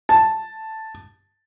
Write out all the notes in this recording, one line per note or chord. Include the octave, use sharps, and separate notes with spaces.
A5